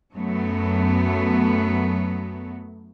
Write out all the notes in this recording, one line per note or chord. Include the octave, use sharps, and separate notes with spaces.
F#2 F#3 A3 B3